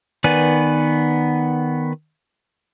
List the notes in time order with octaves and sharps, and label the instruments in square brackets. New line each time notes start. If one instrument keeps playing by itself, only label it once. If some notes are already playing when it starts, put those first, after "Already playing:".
[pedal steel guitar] D#3 B3 B4 D5 G#5